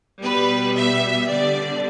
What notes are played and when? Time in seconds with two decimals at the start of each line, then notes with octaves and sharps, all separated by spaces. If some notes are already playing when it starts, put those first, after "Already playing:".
0.22 B2 G3 B3 B4
0.76 E5
1.29 D3 G3 B3 D5